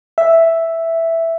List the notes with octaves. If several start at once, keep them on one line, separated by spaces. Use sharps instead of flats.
E5